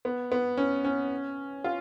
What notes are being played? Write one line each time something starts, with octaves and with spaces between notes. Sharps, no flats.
B3
B3
C#4
C#4
F4